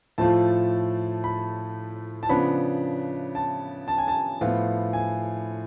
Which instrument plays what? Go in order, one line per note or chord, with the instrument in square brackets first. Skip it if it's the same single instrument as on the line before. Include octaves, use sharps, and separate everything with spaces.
[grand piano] A2 F3 A3 F4 A5
B5
A5
C#3 F3 B3 D4 B5
A5
A5
G#5
A5
A2 F3 B3 F4
G#5